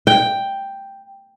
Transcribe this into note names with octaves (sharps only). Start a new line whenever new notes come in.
G5